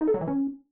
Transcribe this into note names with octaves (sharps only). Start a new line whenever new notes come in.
D#4
A4
F#3
E3
C#4